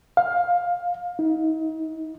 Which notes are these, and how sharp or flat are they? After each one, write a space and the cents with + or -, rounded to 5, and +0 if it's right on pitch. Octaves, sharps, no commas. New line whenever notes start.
F5 +15
D#4 +40